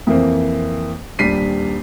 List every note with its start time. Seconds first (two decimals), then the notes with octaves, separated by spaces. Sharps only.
0.07 F2 E3 A#3 C4
1.19 D#1 G3 D4 B6 C7 D#7